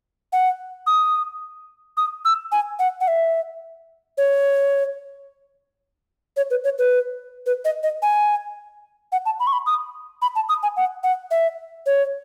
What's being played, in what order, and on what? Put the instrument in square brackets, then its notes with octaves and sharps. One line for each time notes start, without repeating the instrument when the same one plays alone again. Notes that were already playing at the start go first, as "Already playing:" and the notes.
[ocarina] F#5
D#6
D#6
E6
G#5
F#5
F#5
E5
C#5
C#5
B4
C#5
B4
B4
D#5
D#5
G#5
F#5
A5
B5
C#6
B5
D#6
B5
A5
D#6
G#5
F#5
F#5
E5
C#5